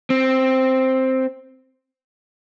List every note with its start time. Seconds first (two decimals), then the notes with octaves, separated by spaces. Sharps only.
0.10 C4